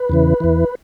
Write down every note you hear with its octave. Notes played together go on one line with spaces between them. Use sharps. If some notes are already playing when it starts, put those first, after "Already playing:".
Already playing: B4
E2 C#3 E3
E2 E3